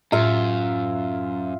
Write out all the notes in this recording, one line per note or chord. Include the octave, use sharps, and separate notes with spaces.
F#2 A2 F4 E5 F5